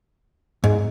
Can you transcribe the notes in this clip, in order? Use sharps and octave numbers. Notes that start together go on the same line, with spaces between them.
G#2